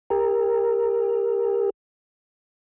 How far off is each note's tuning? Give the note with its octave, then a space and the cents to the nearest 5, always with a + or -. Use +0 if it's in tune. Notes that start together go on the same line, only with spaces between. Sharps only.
G4 +30 A#4 +0